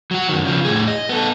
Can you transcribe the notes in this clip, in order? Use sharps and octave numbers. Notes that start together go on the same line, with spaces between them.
F#3 F#4
F#2 D#3
C#3 F3
A2 G#4
D#5
B3 A4